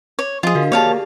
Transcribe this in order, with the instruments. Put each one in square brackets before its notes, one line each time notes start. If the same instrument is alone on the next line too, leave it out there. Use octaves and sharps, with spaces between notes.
[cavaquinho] C#5
[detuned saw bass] F3 [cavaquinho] F4 G#4 [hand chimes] D#5
[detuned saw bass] D3 [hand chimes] F#4 A#4 F5
[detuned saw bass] A#3 [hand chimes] G4 G#4 D5 [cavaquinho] C#5 F5 A5